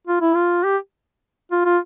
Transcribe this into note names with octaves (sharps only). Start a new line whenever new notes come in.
F4
E4
F4
G4
F4
F4